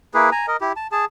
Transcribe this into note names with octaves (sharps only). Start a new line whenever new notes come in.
A#3 E4 G#4 B4
G#5 A#5
A#4 D#5
E4 G4
A5
G#4 A5